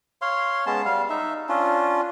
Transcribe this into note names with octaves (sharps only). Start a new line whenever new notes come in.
C#5 F5 C6
G#3 B3 C#4 A5
G3 F5
D#4 E5
C#4 D4 F4